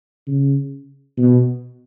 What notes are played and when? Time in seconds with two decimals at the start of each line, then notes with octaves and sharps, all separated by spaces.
0.27 C#3
1.18 B2